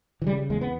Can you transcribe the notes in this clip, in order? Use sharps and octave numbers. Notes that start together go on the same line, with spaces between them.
E3
C#3 G3
E2 G#3
B3